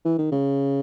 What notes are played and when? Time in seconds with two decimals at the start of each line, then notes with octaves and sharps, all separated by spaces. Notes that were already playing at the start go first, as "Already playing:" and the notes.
0.05 E3
0.19 D#3
0.31 C#3